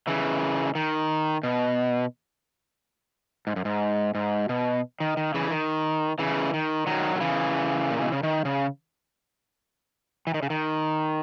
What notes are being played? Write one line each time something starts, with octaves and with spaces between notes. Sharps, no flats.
C#3 E3
D#3
B2
G#2
F#2
G#2
G#2
B2
D#3
D#3
C#3 E3
D#3
C#3 E3
D#3
D#3 F#3
D#3
C#3 E3
A#2
B2
C#3
D#3
C#3
E3
D#3
C#3
D#3